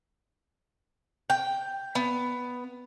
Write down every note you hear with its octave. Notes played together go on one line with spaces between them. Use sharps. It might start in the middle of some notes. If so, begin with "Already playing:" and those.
G5
B3